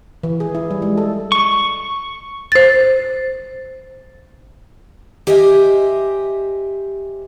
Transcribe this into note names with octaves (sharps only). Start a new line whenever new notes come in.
E3
G#4
E4
G3
G#3
A4
C#6
C5 A6
G4 C5 D#5 E5 G#5